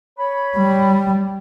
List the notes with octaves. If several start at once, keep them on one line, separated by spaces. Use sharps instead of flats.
C#5 B5
G3